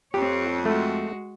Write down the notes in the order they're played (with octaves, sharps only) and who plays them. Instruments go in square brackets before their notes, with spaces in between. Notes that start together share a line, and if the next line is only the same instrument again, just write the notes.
[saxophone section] F2 [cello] C4 C#5 [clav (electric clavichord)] G4
[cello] G#3 F#4 [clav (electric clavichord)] A3